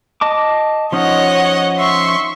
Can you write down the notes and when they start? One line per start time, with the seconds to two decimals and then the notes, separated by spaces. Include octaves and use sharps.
0.21 D#5 A5 D6
0.92 F3 C#4 D#4 C#5 D#5 F#5
1.77 E5 C6 C#6